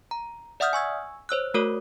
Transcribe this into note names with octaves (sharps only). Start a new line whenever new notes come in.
A#5
D5 E5 F#5 D#6 F6 G6
G#5 C#6 E6 G#6
C5 C#5 E6 F#6
A3 F#4 A#4 C#5 D6